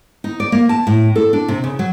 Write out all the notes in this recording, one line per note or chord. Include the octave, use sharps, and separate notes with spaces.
D#4
D5
A#3
A5
A2
A4
D4
C3
C#3
F#3